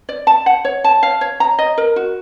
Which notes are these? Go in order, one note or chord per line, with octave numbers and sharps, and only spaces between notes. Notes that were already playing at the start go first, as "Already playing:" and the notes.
D5
A5
F#5
C#5
A5
F5
C#5
A#5
D#5
A#4
F#4